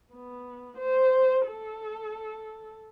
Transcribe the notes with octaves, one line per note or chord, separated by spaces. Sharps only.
B3
C5
A4